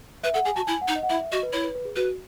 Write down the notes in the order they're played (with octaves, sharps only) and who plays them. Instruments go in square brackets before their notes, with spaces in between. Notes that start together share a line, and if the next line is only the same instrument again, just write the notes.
[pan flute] B4 [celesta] E5
[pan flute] A4 [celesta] F#5
[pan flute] G#4 [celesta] G#5
[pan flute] F#4 [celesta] A5
[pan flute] E4 [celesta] G#5
[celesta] F#5
[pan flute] D#4
[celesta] D#5
F#5
[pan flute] E4 [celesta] E5
[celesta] E5
[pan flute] F#4 [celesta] D#5
[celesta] B4
[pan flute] E4 [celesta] C#5
[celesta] B4
B4
G#4
[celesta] F#4 [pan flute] B4